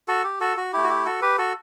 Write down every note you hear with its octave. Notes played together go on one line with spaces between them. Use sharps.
F#4 A4
G4
F#4 A4
F#4
A3 E4 G4
F#4
G4
F#4 A4
G4 B4
F#4 A4